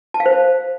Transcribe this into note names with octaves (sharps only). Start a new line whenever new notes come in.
A5
F5
C5